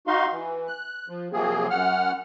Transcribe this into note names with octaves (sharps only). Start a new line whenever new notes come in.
D#4 F#4 F5 C6
E3
F#6
F3
C3 F3 F#3 A#3 C4 G#4
F#2 F#5 F6